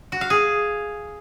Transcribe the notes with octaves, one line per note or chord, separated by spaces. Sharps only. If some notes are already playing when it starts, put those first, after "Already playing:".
F#4
F5
G#4